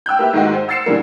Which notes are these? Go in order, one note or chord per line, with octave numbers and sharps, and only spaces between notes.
G5 E6 F#6 G6
A#3 G4 B4 E5
G#2 D#3 G#3 F#4
C5
F#5 E6 A6 C7 C#7 E7
A#2 D3 E3 G3 A#3